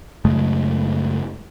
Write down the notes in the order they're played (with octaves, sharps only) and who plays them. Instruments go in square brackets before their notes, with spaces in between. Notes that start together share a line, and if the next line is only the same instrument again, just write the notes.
[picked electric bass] F#2 C#3 G#3 A3